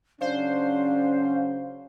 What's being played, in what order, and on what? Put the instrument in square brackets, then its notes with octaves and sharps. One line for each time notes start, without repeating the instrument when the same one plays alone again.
[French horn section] C#3 F#3 C#4 [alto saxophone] D4 [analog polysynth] C5 [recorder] F5